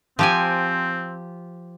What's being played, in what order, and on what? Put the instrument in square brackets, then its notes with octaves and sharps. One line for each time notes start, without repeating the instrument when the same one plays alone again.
[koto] F3 G4 G#5 [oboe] C4